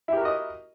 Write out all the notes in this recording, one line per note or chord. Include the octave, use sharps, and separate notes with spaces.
E4 F#4 G4 A#4 D#5